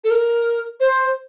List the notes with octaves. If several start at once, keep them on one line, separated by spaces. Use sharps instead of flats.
A4
A#4
C5